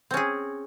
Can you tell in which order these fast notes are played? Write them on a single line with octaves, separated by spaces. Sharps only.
C4 C#4 G#4